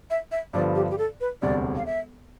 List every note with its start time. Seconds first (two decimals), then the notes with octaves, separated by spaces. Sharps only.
0.10 E5
0.32 E5
0.53 G2 D3 F3 B3 D5
0.76 G4
0.90 G4
0.98 A4
1.21 B4
1.42 E1 D2 C3 G3 D5
1.77 F5
1.86 E5